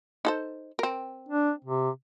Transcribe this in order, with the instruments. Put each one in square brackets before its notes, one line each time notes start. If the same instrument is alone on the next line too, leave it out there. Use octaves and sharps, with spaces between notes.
[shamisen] D#4 A4 C5
C4 A#4
[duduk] D4
C3